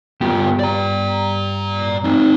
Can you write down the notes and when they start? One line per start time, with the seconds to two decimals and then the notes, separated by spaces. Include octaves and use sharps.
0.21 G2 B3 F4 G4
0.59 D5 A#5
2.04 C4 D#4